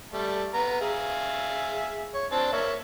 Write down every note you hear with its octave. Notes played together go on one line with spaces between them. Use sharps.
G3 A3
B3 A#5
G#4 E5 F5
C#5
C4 D4 A5
A#3 C#5 E5